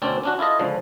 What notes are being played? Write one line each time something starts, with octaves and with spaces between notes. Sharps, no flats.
D2 B2 C4 C#4 D5
C#4 D4 F#4
E4 F4 A4 D#5
C#2 D3 F3